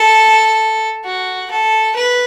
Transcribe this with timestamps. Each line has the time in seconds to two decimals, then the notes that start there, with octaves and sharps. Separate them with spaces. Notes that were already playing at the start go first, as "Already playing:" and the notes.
Already playing: A4
1.05 F#4
1.51 A4
1.96 B4